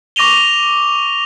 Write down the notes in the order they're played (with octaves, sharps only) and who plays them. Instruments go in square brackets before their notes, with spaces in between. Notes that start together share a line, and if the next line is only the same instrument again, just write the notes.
[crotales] C#6 D6 A#6 D#7 F7 G7